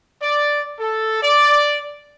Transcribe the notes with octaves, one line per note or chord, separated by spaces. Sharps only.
D5
A4
D5